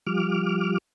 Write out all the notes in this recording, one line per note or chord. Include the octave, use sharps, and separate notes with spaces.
F3 G3 D6 F6